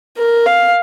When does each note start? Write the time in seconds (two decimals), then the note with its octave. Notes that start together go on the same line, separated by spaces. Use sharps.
0.17 A#4
0.46 F5